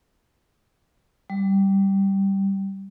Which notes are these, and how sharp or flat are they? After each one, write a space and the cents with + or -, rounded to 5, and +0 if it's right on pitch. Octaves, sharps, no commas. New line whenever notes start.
G3 -5